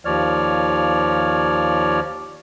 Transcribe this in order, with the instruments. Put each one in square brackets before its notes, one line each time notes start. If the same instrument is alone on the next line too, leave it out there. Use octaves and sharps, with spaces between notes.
[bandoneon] D#2 F3 C#5 D5 F6